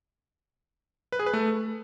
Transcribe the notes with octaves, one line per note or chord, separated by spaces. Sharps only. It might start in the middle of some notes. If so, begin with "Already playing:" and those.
B4
G#4
B4
A3